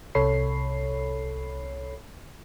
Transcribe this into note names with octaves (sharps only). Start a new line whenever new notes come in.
C2 C3 A4 C#5 B5 C7